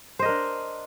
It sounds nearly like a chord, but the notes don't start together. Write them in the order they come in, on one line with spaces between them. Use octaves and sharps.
C5 D#5 A#4 D4